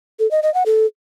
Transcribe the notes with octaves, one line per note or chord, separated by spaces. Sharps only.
A4
D#5
D#5
F#5
A4